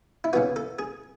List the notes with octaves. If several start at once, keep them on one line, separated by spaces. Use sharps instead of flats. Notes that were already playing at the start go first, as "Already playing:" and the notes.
E4
C#3 E3 B3 F#4
A4
G#4